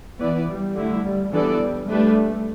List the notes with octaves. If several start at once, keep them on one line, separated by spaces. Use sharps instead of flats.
E3 B3 E4 B4 D5
G3
D3 A3 E4
G3
E3 G3 B3 D4 A4 D5
G3
G3 A3 D4 B4